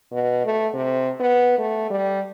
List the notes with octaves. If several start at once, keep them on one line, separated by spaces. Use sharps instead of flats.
B2
A3
C3
B3
A3
G3